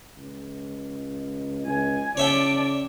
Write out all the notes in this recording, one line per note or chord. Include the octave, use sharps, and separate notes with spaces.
C#2
C#2 G#5
C#3 C#5 D5 E5 G5 A5